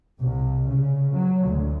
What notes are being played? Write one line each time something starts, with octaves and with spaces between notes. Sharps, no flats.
C2
C#3
F#3
D2